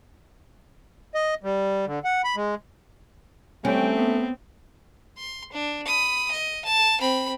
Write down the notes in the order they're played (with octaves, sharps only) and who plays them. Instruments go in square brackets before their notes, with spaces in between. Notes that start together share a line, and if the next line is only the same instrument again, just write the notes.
[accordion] D#5
G3
D3
F#5
B5
G#3
[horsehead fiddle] G3 G5 [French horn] A3 [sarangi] C4 [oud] C#4
[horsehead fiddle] B3
[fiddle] C6
D4
B5 D#6
D#5
A5
C4 B5